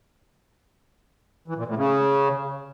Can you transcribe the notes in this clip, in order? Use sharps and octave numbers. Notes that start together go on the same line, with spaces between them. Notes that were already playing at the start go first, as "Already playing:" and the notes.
E3
A#2
A2
C#3